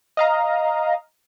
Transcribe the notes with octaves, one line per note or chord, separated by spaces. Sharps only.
D#5 F5 A#5